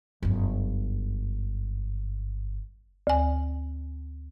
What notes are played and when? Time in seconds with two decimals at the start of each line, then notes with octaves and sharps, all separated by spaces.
0.22 G1 F#2
3.07 D2 G#5